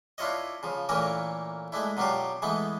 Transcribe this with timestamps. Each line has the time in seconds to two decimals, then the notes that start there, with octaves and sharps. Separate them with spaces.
0.18 D4 E4 F4 C#5 D#5
0.63 C#3 F3
0.89 A#2 E3 A3 A#3 C#4 A#4
1.72 G#3 A3 D4 E4
1.97 B2 F#3 D4 F4 G4
2.42 E3 G#3 A3 B3